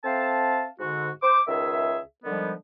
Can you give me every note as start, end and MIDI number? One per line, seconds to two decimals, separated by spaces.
0.04 0.66 60
0.04 0.66 69
0.04 0.66 76
0.04 0.66 77
0.04 0.66 81
0.80 1.10 44
0.80 1.10 50
0.80 1.10 66
1.23 1.40 72
1.23 1.40 86
1.48 1.98 37
1.48 1.98 51
1.48 1.98 68
1.48 1.98 76
2.24 2.52 50
2.24 2.52 51
2.24 2.52 53
2.24 2.52 55
2.24 2.52 56
2.24 2.52 59